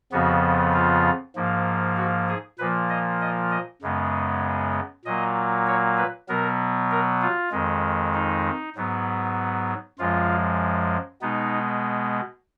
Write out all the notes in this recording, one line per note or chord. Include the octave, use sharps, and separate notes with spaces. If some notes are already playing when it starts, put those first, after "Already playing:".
F2 C#3 F3 B3 F#4
F4
G#2 F3 A#3
F#4
G#4
A#2 F3 A#3 B4
D#5
D#5
D#5
F#2 C#3 G#3 B3
A#2 F#3 A#3 D#5
C#5
B4
B2 F#3 B3 A#4
A#4
F4
F2 D#3 G#3
D#4
G#2 F#3 B3
F#2 F3 G#3 F4
B2 G#3 B3 D#4